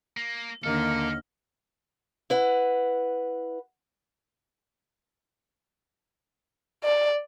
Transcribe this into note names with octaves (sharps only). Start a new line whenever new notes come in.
A#3
D#2 D3 A#3 A4 D5 D#5 F6
E4 B4 F#5
D5